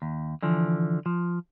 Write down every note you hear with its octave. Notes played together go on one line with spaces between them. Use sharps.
D#2
D3 E3 F3
F3